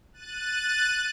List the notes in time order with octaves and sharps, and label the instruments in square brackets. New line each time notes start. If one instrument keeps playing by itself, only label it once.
[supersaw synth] F#6 A6 D#7